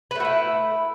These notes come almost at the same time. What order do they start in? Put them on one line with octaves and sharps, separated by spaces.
B4 A3 F#4 E4